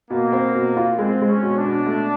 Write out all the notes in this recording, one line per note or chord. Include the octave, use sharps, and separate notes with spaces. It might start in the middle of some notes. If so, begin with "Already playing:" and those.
B2 A#3
C4
B2
F4
G#3 C4
G#3
C#4
B2
D4
B2
A3